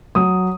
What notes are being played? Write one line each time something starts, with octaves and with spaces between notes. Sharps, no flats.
F#3 D#6